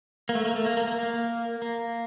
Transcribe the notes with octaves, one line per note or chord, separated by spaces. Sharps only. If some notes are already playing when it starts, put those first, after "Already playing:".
A#3
A3
A#3
A3
A#3
A#3
A#3
A#3
A#3